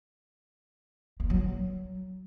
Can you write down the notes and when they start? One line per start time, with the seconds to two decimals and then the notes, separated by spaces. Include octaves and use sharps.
1.20 A#3
1.30 F#3
1.40 F#3